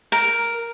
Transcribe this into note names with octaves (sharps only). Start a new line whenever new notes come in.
A#4